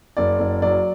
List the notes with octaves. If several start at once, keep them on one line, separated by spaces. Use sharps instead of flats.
F#1 D5
F#1
F#3 D5